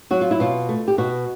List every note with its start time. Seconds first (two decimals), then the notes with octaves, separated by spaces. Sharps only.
0.10 F#3 F#4
0.21 F4
0.31 E4
0.40 B2 F4
0.69 A3
0.88 G4
0.98 B2 F#4